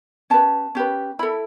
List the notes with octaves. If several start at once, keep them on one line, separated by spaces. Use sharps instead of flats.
C#4 G4 B4 A5
C#4 G4 B4
E4 A4 B5